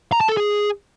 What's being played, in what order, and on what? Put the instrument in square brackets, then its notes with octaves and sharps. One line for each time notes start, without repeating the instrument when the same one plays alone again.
[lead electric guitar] A#5
A5
A4
G#4